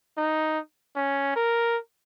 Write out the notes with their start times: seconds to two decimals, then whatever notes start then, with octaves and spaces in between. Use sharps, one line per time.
0.17 D#4
0.96 C#4
1.36 A#4